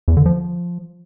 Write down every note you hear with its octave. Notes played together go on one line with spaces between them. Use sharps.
E2
D3
F3